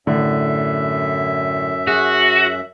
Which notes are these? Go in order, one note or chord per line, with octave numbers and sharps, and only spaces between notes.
F#2 A2 D3 E5
F#4 G#4